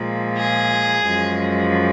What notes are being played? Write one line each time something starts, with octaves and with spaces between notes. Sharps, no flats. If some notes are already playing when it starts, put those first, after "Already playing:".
Already playing: A#2 F3 G#3
G#4
F#2 F3 G#3